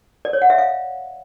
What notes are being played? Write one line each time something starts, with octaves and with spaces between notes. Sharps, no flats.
D5
C#5
F#5
E5
F5